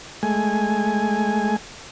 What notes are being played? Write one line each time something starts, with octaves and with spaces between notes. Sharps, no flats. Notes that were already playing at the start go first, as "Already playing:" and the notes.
G#3 A3 G#5